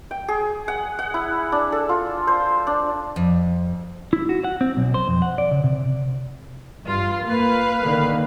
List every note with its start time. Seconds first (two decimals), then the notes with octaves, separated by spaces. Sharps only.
0.11 G5
0.28 G#4
0.68 F#5
0.99 F#5
1.14 E4
1.52 D4
1.72 A4
1.89 F4
2.27 C5
2.67 D4
3.16 F2
4.13 E4
4.29 F#4
4.44 F#5
4.61 C4
4.77 B1
4.94 C5
5.08 F2
5.22 F#5
5.38 D5
5.51 C#3
5.64 C3
6.86 G2 F4
7.26 A#3 B4 F5
7.82 D3 D#3 A#3